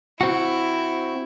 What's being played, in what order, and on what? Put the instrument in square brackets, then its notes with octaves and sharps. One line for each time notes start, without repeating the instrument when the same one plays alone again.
[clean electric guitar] C4 F#4 [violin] E4